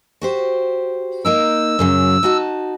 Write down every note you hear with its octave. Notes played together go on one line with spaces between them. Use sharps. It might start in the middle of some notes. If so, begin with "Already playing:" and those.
F#4 G4 C5
A#3 D#4 A#4 E6
F#2 C#3 F#3
D#4 F#4 A5